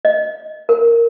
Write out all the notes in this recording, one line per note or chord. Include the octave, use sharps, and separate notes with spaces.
D#5
A#4